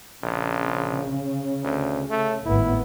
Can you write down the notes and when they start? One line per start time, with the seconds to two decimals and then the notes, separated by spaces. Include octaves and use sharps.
0.23 A#1 C#3
1.64 D2
2.10 A3
2.46 G#1 A2 B3 E4